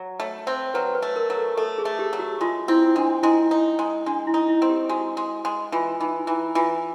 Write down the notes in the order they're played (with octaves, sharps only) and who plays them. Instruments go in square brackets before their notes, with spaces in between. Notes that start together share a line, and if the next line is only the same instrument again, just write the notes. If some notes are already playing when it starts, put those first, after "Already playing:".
Already playing: [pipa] F#3
[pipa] A3 [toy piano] C#5
[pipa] C4 [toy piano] C5
[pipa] F#3 [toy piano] B4
[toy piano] B4
[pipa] A3
[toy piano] A#4
[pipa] F#3
[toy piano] A4
[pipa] A3 [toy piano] A4
[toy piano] G#4
[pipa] A3
[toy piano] G4
[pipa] F#3
[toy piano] F#4
[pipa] G#3 [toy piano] F4
[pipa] C4 [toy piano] E4
[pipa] G#3 [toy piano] D4
[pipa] G#3 [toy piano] E4
[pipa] D#4
G#3
[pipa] G#3 [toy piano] D4
[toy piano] E4
[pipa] D#4
[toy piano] E4
[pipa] C4
[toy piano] G4
[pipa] G#3 [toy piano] F#4
[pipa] G#3
G#3
[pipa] E3 [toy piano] F4
[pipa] E3 [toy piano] D#4
[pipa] E3 [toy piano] E4
[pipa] E3 [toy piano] F4